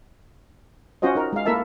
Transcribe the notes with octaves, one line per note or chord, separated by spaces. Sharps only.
C#4 F4 F#4 C5 D#5
D#4 A#4
G#3 F5
A#3 E4 A4 A#4 E5 A5